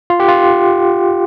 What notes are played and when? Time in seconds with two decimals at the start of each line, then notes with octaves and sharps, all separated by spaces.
0.10 F4
0.20 G4
0.28 F4